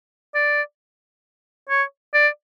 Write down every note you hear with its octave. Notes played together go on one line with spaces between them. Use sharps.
D5
C#5
D5